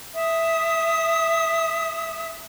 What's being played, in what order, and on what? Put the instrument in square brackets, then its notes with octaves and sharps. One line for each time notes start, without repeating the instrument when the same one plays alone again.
[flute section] E5 D#6